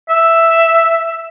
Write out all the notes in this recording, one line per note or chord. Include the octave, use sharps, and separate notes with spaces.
E5